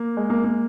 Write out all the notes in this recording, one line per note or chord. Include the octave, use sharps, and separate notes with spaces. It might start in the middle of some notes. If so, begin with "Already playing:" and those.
Already playing: A#3
G#3
A#3
A#3